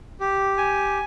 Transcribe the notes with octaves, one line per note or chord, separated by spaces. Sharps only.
G4
G#5